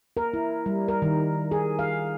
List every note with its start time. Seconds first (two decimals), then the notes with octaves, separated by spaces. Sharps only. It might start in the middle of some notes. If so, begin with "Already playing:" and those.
0.17 A#4
0.33 E4
0.66 G3
0.88 A#4
1.02 D#3
1.51 G#4
1.79 F5